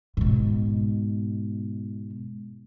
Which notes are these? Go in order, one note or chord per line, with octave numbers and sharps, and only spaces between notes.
G#2 B2